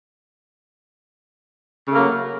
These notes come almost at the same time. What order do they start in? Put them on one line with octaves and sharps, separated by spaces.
C#3 A3 A#3 F#3